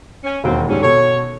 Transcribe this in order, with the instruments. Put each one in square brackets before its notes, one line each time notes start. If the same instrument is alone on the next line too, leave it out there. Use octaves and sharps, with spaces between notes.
[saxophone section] C#4
[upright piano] E1 D#2 F#4 [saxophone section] C4
[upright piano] G#2 D#3 G3 [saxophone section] D3 F#3 C#4
[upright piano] B2 A4 [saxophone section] C#5